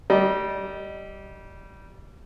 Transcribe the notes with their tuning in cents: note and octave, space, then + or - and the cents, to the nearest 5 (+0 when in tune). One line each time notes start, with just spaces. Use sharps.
G3 -20 D#5 +0